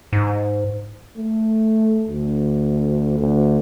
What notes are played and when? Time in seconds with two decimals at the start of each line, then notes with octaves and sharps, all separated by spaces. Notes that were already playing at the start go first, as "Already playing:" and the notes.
0.13 G#2
1.17 A3
2.08 D2
3.19 D2